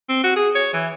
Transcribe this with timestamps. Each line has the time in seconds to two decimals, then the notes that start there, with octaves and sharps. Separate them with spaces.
0.09 C4
0.24 F#4
0.36 G#4
0.55 C#5
0.74 E3